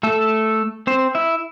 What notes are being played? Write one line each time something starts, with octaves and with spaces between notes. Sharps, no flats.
A3 A4
C4 C5
E4 E5